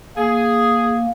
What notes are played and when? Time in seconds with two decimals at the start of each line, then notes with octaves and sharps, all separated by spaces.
0.17 A#3 G#4